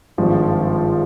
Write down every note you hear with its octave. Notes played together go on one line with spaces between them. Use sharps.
G#1 G2 F3 G#3